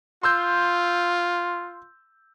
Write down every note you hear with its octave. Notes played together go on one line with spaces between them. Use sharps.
F4 C6 E6 G6